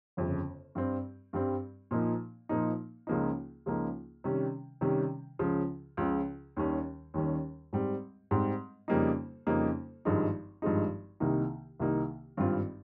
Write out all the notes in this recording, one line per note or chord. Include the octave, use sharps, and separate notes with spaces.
G1 F2 C#3
G2 G3 C4
G2 G3 C4
A#2 F3 A#3 D#4
A#2 F3 A#3 D#4
C#2 C#3 F3 A#3 D#4
C#2 C#3 F3 A#3 D#4
C3 D#3 G3 C#4
C3 D#3 G3 C#4
C#2 C#3 F3
C#2 C#3 F3
D#2 D#3 G3 C#4
D#2 D#3 G3 C#4
G#2 G3 C4
G#2 G3 C4
F2 C#3 G3 A#3 D#4
F2 C#3 G3 A#3 D#4
G#1 G2 F3 G#3 D#4
G#1 G2 F3 G#3 D#4
C2 C3 D#3 A#3 D#4
C2 C3 D#3 A#3 D#4
G#1 G2 G3 C4 F4